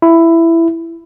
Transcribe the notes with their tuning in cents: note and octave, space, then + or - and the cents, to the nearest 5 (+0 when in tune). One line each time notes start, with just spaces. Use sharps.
E4 +10